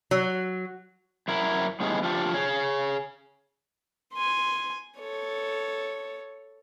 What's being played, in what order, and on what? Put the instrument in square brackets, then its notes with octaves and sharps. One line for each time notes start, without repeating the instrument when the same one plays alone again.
[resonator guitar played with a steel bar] F#3
[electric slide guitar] F#2 E4 A#4
A2 C#3 G3 B3 D#4 G#4
D3 F3 F4 G4 A4
G#4 C#5
[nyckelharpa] G#5 C6
A4 C#5